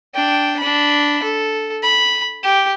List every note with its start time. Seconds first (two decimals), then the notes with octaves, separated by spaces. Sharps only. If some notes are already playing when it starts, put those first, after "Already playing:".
0.14 D4 G5
0.59 D4 B5
1.23 A4
1.83 B5
2.43 G4